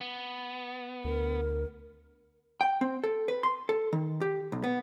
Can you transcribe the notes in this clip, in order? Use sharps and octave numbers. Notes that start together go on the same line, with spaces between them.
B3
D2 A#4
G5
C4
A4
B4
C6
A4
D#3
G4
B1
B3